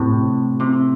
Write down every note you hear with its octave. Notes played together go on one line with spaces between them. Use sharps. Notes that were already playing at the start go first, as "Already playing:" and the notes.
Already playing: A2 C3
C3